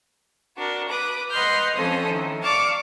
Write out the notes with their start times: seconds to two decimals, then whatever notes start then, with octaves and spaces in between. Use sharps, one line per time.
0.58 D4 F#4 A#4
0.88 B4 D6 D#6
1.31 B4 D#5 F#5 C6 F6 G6
1.75 F2 F3 C#4 A4 C5 D#6
2.07 A2 D#3
2.42 D5 F5 A5 C#6 D6